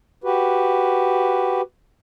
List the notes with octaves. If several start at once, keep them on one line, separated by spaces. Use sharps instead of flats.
F#4 G4 B4